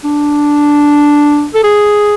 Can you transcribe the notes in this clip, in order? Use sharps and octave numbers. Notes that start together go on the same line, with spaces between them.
D4
A4
G#4